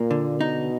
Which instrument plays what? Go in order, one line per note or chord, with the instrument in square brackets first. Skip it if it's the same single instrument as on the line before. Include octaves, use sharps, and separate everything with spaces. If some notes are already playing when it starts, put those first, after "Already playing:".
Already playing: [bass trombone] A#2 [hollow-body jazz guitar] A#3
[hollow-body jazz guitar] D3
[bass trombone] B2 [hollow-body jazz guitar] D#4